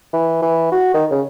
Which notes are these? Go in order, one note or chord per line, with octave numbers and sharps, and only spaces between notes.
E3
E3
F#4
D#3
C#3